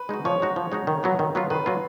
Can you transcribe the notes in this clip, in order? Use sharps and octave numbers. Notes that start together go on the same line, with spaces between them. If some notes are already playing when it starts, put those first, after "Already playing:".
Already playing: B4
G#3 D#4 F#4
F3 C#5
G#3 D#4 F#4
F3
G#3 D#4 F#4
D#3
F#3 B3 F4
D#3
F#3 B3 F4
D#3 B4
F#3 B3 F4